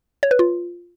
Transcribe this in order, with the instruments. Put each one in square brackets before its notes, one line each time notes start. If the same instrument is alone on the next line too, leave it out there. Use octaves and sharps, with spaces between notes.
[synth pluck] C#5
B4
F4